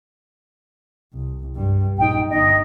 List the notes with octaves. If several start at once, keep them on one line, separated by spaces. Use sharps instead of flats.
C2
G2 G3
A#1 D#4 G5
G1 D#4 D#5